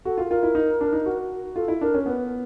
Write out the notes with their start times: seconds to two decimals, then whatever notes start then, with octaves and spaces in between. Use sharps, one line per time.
0.05 F#4 A4
0.18 F4
0.25 A4
0.30 F4 A#4
0.43 E4
0.55 D#4
0.81 D4
0.93 D#4
1.06 F#4
1.56 F4 A4
1.68 E4
1.81 D4 A#4
1.94 C#4
2.06 B3 B4